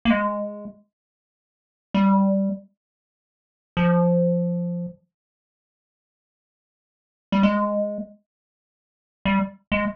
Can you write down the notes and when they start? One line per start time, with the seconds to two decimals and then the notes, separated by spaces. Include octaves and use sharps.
0.05 A#3
0.10 G#3
1.94 G3
3.77 F3
7.32 G3
7.43 G#3
9.25 G3
9.72 G#3